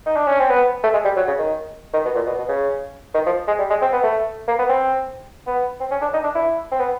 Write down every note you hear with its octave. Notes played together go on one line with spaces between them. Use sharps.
D#4
D4
C#4
C4
B3
A3
G#3
G3
F#3
C#3
D#3
D#3
B2
A#2
B2
B2
C#3
D#3
F3
G#3
G3
G#3
C4
B3
A3
A#3
B3
C4
B3
C4
C#4
D4
D#4
D4
E4
C4
B3